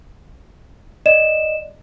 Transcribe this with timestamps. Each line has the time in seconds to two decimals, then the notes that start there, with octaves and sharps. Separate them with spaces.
1.06 D5 D#5 E7